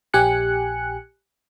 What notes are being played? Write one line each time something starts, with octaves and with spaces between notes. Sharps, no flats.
A#1 G4 G#5 F#6 C#7